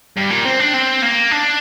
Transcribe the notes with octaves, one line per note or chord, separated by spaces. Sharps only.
G2
A#2
C4
D4
C4
A#3
D4